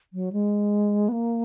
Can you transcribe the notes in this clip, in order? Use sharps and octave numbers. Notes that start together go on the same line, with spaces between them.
F#3
G#3
B3
A#3